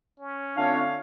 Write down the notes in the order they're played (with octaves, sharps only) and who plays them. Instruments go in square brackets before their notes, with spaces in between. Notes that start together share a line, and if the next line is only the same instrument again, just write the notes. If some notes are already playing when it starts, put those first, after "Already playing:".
[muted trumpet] C#4
[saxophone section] D3 F5 [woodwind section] A3 C4 D4 [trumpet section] F4 C#5